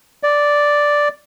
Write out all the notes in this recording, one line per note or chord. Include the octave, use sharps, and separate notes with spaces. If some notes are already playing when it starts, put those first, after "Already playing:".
D5